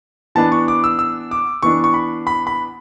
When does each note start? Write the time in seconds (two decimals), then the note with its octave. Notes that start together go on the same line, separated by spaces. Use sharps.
0.35 E3 B3 D4 A5
0.52 C#6
0.68 D6
0.84 E6
0.99 E6
1.31 D6
1.63 E3 B3 D4 C#6
1.84 C#6
1.94 B5
2.27 B5
2.47 B5